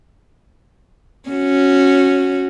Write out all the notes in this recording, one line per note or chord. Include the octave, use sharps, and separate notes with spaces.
C#4 F#4